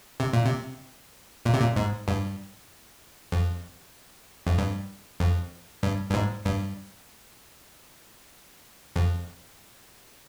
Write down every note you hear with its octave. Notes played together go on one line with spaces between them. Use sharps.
C3
A#2
C3
A#2
C3
A#2
G#2
G2
F2
F2
G2
F2
G2
G2
G#2
G2
F2